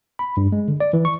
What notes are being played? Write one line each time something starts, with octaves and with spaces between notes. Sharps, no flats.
B5
G2
G#3
D3
D5
E3
C#6